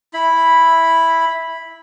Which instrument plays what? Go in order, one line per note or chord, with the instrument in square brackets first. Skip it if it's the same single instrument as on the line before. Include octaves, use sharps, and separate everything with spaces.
[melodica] E4 B5